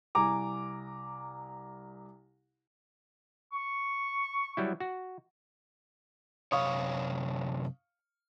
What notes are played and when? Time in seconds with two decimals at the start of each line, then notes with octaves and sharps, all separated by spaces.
0.15 C2 G#5 A#5 D6
3.53 C#6
4.57 F#3 G3 E4
4.80 F#4
6.52 F#2 C3 C#5 F5 C#6 D#6